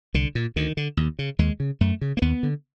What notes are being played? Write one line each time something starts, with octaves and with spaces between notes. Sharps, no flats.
C2 D3
A#2
D2 D#3
D3
D#2
C#3
D#2 G#3
C#3
F#2 A3
C#3
A#3
D#2 B3
D3